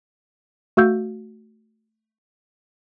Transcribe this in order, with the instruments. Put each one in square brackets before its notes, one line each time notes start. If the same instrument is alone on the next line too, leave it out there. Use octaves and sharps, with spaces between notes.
[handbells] A3 F#4 F5 E6 G6